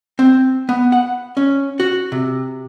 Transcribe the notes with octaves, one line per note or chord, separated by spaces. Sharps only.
C4
B3
F#5
C#4
F#4
C3